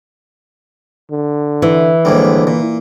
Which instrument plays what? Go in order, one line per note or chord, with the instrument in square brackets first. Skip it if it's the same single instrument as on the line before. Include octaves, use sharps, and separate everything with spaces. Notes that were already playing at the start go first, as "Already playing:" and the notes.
[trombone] D3
[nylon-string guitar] E3
[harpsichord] D#2 G#2 G3 [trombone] D3
[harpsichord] A#2